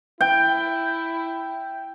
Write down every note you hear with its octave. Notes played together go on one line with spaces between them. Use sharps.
E4 G5